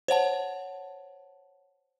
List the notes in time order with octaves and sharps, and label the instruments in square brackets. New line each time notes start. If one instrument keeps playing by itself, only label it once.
[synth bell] C5 C#5 F#5 A5